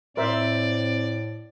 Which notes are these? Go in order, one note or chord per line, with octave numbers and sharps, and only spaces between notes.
A2 C4 A#4 C5 D5 E5